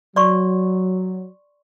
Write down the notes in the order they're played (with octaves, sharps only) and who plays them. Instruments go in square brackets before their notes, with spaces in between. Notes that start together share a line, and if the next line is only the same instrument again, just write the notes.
[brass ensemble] F#3 [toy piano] D5 C6 C#6